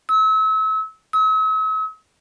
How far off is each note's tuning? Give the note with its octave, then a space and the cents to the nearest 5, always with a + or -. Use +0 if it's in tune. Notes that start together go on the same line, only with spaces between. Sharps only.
E6 -35
E6 -45